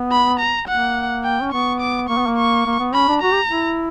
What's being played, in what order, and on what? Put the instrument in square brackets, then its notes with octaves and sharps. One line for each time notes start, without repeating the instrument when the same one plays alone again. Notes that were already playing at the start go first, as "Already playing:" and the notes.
Already playing: [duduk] B3
[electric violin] B5
A#5
[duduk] A#3 [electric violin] F#5
[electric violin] G5
[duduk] C#4
[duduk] B3 [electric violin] C#6
[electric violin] D6
[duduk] A#3 [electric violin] C#6
[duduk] B3
A#3
[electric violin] C#6
[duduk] A#3
B3
[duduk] C#4 [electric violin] B5
[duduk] D4
[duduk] F#4 [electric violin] A#5
[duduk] G4
E4